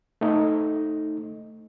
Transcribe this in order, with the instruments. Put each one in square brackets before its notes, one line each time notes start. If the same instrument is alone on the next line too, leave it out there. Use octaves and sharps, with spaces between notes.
[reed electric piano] A3 D#4